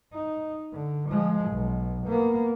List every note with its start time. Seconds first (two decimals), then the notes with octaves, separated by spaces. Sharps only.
0.14 D#4
0.73 D3
1.10 F3 G#3
1.51 B1
2.07 A#3 B3